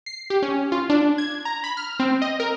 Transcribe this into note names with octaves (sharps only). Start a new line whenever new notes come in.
C7
G4
C#4
F4
D4
G#6
A#5
B5
F6
C4
D#5
A#4